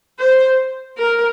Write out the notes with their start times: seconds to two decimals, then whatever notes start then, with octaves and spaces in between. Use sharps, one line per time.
0.19 C5
0.98 A#4